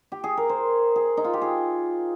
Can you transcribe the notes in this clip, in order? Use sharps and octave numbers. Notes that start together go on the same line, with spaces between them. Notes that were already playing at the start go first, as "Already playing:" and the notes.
Already playing: F4
G4
G#4
A#4
C5
G#4
D#4
F4
G4
G#4